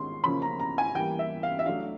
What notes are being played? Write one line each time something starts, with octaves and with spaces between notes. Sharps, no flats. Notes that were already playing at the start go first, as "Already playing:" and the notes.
Already playing: D#3 G#3 C#4 C6
C#3 F3 A#3 C#4 B5
A#5
A#5
G#5
E3 G3 A#3 G5
E5
F5
E5
F#3 A3 D4 F5